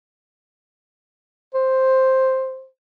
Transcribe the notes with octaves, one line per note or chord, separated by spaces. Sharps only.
C5